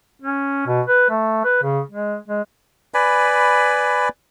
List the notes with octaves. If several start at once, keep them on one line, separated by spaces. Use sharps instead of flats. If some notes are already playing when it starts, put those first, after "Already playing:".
C#4
B2
B4
A3
B4
C#3
G#3
G#3
B4 D5 G#5 B5